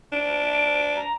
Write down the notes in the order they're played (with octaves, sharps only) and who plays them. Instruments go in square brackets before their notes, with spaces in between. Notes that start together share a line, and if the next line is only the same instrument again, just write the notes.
[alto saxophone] D4 [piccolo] D7
[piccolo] A#5